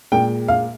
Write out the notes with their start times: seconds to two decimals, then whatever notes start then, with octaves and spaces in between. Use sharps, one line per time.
0.12 A#2 G#3 G5
0.48 F5